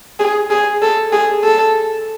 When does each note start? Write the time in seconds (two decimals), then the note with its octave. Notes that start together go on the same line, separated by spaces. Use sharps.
0.20 G#4
0.50 G#4
0.82 A4
1.13 G#4
1.44 A4